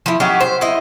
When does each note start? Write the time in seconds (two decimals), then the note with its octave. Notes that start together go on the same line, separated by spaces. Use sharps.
0.06 F3 E4
0.20 F#3 C#4 D#4 G4
0.41 C5
0.61 E4 C5 D#5